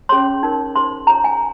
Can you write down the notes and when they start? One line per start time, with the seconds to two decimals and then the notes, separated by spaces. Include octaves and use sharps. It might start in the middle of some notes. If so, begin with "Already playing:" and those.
0.09 C#4 G#4 C#5 C6
0.43 D#4 A#4 C#5
0.76 D#4 G#4 C5 C6
1.07 F4 G#4 C#5 A#5
1.24 G#5